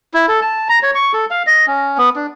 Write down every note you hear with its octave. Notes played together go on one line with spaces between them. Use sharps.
E4
A4
A5
A#5
C#5
C#6
A4
F5
D#5
C#4
B3
D4